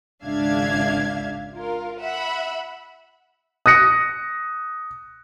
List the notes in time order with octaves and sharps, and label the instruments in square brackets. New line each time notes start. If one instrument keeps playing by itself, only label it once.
[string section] G#1 C#2 D4 E5 F5 G#6
F4 A#4
E5 F#5 B5
[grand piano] D#6 F#6 A#6 C#7